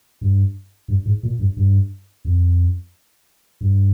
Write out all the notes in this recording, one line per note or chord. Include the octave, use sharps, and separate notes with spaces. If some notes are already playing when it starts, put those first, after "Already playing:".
G2
G2
G#2
A#2
G2
G2
F2
G2